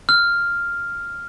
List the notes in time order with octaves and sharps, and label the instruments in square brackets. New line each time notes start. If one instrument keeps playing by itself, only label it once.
[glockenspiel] F6